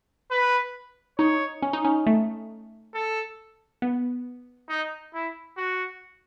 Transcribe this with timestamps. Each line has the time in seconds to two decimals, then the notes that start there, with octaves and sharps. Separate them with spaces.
0.31 B4
1.19 D#4 C#5
1.62 C#4
1.73 D#4
1.85 C#4
2.06 A3
2.94 A4
3.82 B3
4.69 D#4
5.14 E4
5.57 F#4